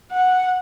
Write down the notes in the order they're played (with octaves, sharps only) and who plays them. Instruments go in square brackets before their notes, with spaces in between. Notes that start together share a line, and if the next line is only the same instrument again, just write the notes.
[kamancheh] F#5